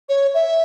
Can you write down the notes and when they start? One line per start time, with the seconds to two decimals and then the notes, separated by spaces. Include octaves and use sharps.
0.09 C#5
0.34 E5